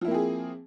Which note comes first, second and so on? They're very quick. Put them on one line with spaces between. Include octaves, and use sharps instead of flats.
F3 E4 A#3 C4 G#4